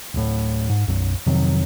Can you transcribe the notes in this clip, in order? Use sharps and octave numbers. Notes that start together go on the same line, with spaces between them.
D1 A2
G#2
B1 F#2
F2 C3 D#3 F#3